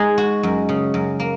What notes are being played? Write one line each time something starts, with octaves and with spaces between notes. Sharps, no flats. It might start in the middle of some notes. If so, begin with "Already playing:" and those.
Already playing: G#3 D#4
F#4
F#2
C#3
F#2
A#3